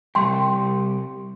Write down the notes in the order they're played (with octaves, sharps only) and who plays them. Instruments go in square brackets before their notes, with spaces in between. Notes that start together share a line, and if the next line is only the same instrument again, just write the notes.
[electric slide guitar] C3 G3 G4 [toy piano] G5 C6